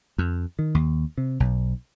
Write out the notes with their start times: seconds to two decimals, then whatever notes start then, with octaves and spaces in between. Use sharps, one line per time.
0.18 F2
0.59 D#3
0.75 D#2
1.18 C3
1.40 B1